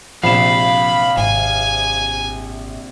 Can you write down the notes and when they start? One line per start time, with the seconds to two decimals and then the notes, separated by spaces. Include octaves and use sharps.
0.23 A#1 C3 F3 F5 B5 E7
1.18 G#1 G#5